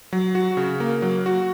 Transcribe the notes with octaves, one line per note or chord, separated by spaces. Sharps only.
F#3
F#4
C#3
A#3
F#3
F#4